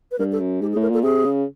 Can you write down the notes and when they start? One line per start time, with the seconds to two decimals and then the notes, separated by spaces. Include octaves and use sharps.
0.11 B4
0.19 G2 A#4
0.32 A4
0.39 F#2
0.61 G#2 G4
0.72 G#4
0.76 A2
0.82 A#4
0.90 A#2 A4
1.03 C3 G#4
1.25 C#3